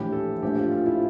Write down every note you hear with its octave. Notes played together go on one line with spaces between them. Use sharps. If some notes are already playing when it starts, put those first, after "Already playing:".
Already playing: A#1 A2 E3 G4
A4
A#1 A2 F3 A3 G4
F4
F4
E4